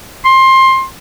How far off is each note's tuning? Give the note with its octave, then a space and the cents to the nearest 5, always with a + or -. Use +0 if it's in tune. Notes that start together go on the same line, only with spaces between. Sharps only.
C6 +20